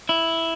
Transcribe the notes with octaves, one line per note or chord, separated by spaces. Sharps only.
E4